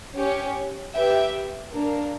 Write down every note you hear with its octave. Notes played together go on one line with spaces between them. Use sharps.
C#4 G4 C#5
G4 B4 E5 G5
A#3 D4 A#4